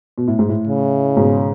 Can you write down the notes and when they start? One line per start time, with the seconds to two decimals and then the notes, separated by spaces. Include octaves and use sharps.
0.18 B2
0.28 A2
0.39 G#2
0.49 A2
0.67 C#3
1.17 G#2 B2